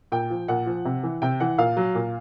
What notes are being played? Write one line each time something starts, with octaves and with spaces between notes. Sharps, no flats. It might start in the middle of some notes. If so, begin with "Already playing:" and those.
A#2 G5
F3
A#2 F#5
F3
C3
E3
C3 G5
E3 F#5
A#2 F5
F#3
A#2